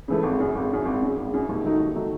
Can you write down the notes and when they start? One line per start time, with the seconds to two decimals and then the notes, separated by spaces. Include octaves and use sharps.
0.08 C#3 E3 A3
0.23 G#1
0.39 F#2 C#3
0.55 G#1
0.71 F#2 C#3
0.85 G#1
1.02 F#2 C#3
1.17 G#1
1.32 F#2 C#3
1.49 D#2
1.64 D#3 A3 D#4 F#4
1.79 D#2
1.96 D#3 A3 D#4 F#4